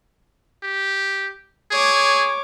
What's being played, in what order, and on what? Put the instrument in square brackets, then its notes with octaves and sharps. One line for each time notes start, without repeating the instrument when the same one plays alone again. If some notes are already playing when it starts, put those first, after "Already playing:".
[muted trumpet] G4
[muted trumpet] G#4 [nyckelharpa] C#5 D6